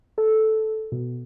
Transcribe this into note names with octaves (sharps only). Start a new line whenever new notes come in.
A4
B2